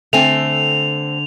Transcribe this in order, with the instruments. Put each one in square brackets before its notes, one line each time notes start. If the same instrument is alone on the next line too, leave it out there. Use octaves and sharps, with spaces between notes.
[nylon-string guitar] D3 G#5 [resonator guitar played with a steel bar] A3 C4 [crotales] F7